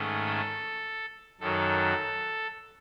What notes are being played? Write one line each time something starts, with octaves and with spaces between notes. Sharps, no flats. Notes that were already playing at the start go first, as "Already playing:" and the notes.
Already playing: G#2 D#3 A3 C#4
A4
F#2 D#3 F#3 A4